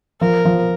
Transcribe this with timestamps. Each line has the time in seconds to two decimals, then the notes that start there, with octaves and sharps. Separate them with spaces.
0.21 F3 A#4
0.45 F3